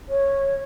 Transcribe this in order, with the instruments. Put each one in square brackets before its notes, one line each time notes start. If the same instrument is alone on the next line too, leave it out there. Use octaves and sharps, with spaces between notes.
[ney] C#5